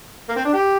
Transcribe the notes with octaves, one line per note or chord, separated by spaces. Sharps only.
A#3
C4
D4
G4